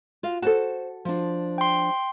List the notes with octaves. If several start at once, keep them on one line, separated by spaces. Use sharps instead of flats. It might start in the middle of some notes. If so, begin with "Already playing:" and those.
F4 F#4 F5
F#4 A4 C5 A5
F3 D4
G5 C6